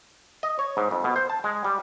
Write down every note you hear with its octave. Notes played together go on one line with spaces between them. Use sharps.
D#5
C#5
G#2
F2
B2
C5
A5
G#3
G3